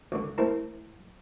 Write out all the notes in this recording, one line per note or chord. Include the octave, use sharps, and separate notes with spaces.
C#2 D3
A3 C4 E4 A4 A#4